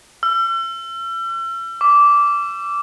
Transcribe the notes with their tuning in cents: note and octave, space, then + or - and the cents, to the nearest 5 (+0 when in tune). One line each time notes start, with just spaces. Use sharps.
E6 +40
D6 -15